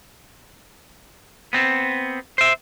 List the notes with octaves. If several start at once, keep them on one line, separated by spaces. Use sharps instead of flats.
B3 C4
C5 E5